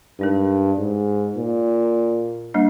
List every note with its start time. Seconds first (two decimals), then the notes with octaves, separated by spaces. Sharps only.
0.19 G2 G#3 D#4 A#4
0.78 G#2
1.37 A#2
2.54 G3 A#3 D4